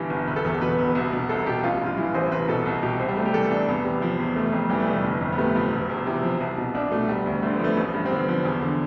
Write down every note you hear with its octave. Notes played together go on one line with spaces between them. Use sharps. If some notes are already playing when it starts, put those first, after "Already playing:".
Already playing: G1 G2 E3
G1
E1 B4
A4
E2 B4
A4
B2 B4
E1
C2
B2
C2 A4
B2 G4
A1 F4
G2
F4
E3 E4
A1 C5
C2 B4
B2 A4
C2
B2 G4
C2 C4
G3
C3 A3
G4
E3 A4
C2 D4
E2 B3
C3
F3
E2
F1 A3
F2
E3 G3
A3
F1 G3
G1
F2
B3
C3 A3
F3
E1
E2
C3 E4
F3
C2
B2
C2 D4
B2 A3
E1 G3
D2
D3 A3
B3
F3 A3
A1
G2
C4
D3 B3
F3
E2
D3